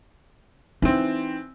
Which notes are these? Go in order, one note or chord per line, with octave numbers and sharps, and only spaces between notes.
E3 C4 D#4